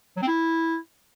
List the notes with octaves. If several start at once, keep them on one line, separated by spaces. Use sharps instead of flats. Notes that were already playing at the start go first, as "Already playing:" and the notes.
F#3
C4
E4